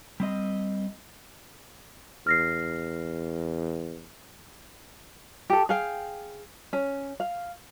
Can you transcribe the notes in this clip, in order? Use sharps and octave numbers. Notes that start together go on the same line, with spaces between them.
G3 C4 D#5
E2 F6 A#6 C7
G4 A4
G#4 F5 G5
C#4
F5